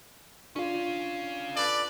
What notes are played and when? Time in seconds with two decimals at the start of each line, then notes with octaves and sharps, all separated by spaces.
0.56 C#4 D4 F4 F5
1.55 A4 B4 D5